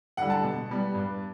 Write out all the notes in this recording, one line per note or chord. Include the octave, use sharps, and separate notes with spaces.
D3 G3 F#5
A5
B2
G3 B3
G2